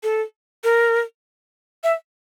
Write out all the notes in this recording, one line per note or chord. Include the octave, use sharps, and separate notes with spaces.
A4
A#4
E5